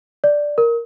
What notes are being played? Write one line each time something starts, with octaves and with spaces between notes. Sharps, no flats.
D5
A#4